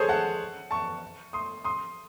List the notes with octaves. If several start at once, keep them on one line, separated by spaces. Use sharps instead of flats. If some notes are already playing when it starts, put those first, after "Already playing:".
Already playing: G#4 A4 C5 C#5
F#5 A5
A5 C#6
C6 D#6
C6 D#6